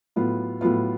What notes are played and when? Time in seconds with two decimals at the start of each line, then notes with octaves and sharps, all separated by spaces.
0.16 A2 F#3 B3 F4
0.61 A2 F#3 B3 F4